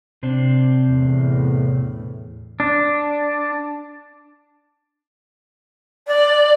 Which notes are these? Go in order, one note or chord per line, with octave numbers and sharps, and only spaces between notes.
C3 C4 D4
E2 A2
D4
D5